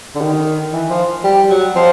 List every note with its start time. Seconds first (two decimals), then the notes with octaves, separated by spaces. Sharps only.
0.15 D3
0.21 D#3
0.73 E3
0.90 F3
1.24 G3
1.49 F#3
1.76 F3